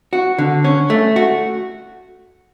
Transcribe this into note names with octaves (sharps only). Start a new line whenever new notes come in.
F#4
D3
C#4
A3
F#4